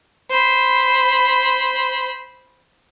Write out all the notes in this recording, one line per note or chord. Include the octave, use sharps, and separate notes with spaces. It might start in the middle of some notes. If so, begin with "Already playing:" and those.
C5 B5